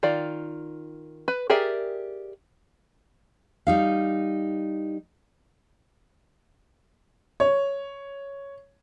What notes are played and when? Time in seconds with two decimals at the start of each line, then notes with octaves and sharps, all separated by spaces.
0.03 D#3 F4 D5
1.28 B4
1.50 G4 G#4 A#4 D5 E5
3.67 G3 D#4 F5
7.40 C#5